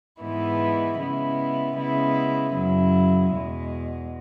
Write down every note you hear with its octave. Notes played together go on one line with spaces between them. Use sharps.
G#2 E3 G#3 B3 E4
C#3 G#3 B3 E4
C#3 G#3 B3 E4
F#2 C#3 F#3 E4
E2 B2 G#3